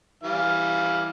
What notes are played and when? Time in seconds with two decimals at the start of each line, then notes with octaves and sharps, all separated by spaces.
0.23 E3 G3 F5